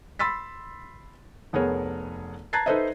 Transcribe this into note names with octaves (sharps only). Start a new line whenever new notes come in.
B5 C6 E6 A6 B6
F1 B3 G#4 A#4 C#5
A5 A#5 F#6 G#6 A6 C7
D#4 A4 B4 C5 D#5 E5